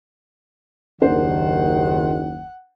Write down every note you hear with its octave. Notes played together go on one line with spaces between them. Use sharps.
F#1 D#2 D#3 D4 C5 F#5